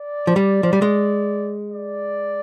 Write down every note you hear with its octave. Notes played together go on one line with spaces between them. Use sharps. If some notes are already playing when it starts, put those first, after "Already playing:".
Already playing: D5
F3
G3
F3
G3
G#3
D5